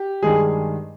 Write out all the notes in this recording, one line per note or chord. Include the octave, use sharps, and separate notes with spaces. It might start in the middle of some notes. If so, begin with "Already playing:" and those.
Already playing: G4
G2 D#3 G#3 G#4